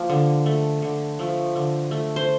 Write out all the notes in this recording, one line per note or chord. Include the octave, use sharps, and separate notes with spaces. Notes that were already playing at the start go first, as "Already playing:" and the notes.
Already playing: F3 A#3
D3
A3
D3
F3 A3
D3
A3
C5